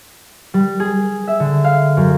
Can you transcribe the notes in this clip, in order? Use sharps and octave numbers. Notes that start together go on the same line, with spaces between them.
G3
G#4
E5
D3
F5
F#2